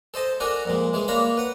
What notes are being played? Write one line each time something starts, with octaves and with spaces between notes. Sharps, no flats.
A4 C5 D#5 A5
D4 F#4 A4 A#4 G#5
F2 A#2 G#3
E3 G#3 G#4
A#3 D4 C#5 F5 A#5 B5
B4 F#5